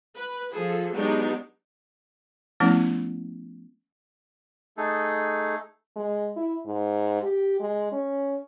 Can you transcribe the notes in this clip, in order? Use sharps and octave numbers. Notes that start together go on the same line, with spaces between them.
B4
F3 G#4 A4
F#3 G#3 B3 D4 D#4 G4
F3 A3 B3 C#4 E4
A3 D#4 G#4 A4
G#3
E4
G#2
G4
G#3
C#4